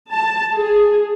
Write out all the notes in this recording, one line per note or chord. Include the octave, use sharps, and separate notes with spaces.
A5
G#4